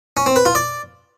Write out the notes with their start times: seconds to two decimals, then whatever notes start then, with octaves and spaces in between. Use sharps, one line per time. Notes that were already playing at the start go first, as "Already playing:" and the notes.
0.17 C#4
0.26 C4
0.36 B4
0.46 F4
0.55 D5